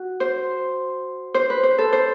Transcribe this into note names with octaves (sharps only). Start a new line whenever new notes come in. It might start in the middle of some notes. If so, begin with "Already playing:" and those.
Already playing: F#4
C5
C5
B4
C5
A4
C5